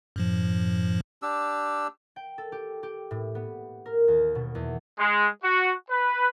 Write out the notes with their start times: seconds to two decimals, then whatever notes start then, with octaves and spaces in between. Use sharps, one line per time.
0.16 F#2 A2 F3
1.22 D4 G4 E6
2.16 G5
2.38 A4
2.52 G4
2.83 G4
3.11 A2
3.35 B3
3.86 A#4
4.08 D#2
4.35 B2
4.55 E2
4.99 G#3
5.44 F#4
5.90 B4